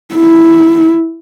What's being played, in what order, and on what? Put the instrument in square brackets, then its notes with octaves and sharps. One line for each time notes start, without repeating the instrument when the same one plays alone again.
[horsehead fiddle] E4